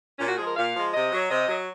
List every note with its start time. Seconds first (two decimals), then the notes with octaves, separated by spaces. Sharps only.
0.19 A#2 C#4
0.28 F#4
0.37 F3 G#4
0.40 G#3
0.47 A#4
0.56 A#2 F5
0.74 F3 G#3
0.94 C3 D#5
1.12 F#3
1.30 C3 D#5
1.48 F#3